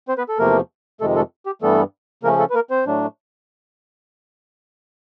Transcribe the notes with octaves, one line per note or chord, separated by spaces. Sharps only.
C4 C5
B3 B4
A4
E2 C3 F3 A3 A#3 A#4
F2 C3 D#3 G#3 A3 A4
A3 A4
G4
G2 E3 G3 A3 B3 A4
C#3 F3 A3 A#3 C#4 A#4
A3 A4
B4
A#3 A#4
C4 C5
A2 F#3 A3 D4